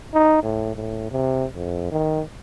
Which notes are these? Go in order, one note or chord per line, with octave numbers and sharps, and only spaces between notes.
D#4
A2
A2
C3
F2
D#3